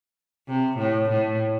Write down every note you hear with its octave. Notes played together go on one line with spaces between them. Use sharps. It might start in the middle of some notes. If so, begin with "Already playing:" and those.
C3
A2
A2